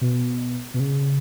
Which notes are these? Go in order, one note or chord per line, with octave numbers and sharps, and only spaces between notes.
B2
B2
C#3